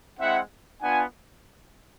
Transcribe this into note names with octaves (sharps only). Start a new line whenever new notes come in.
G#3 C4 E4 E5 F#5
B3 D4 F4 F#5 G#5